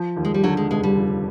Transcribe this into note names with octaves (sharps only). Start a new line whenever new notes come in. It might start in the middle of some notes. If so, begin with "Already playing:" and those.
Already playing: F3
D#2
G#3
G3
D3 F#3
G#3
F1 G#3
G3
F3